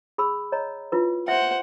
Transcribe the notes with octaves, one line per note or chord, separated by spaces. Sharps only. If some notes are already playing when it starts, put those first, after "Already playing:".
G#4 B5 E6
C#5 D#5 A#5
E4 F4 B4
C5 E5 F#5